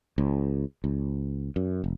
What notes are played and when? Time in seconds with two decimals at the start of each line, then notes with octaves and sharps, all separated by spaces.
0.18 C#2
0.84 C#2
1.56 F#2
1.84 F1